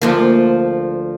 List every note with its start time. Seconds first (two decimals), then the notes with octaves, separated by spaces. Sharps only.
0.02 D2 F3 A#3